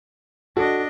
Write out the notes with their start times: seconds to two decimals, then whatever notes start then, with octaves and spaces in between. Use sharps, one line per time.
0.57 D4 F#4 A4 D#5